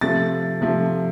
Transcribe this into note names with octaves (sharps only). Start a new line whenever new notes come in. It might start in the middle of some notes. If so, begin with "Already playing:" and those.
C3 F3 A3 A6
C3 F3 A3